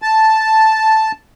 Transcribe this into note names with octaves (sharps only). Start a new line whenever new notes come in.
A5